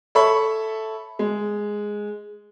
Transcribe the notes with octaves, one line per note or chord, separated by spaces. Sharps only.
A4 C#5 E5 B5 C#6
G#3